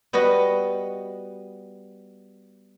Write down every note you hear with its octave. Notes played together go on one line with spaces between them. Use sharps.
G3 B3 F#4 B4 D#5